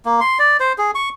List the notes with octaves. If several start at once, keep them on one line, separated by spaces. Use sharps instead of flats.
A#3
C6
D5
C5
G#4
C#6